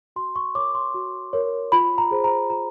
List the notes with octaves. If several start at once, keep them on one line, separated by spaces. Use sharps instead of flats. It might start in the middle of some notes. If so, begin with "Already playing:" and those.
F#4 C6
C#6
A#4 C#5 D6
C6
F#4
A#4 C#5
F4 B5
A#5
G#4 C5
A#5
F4 A#5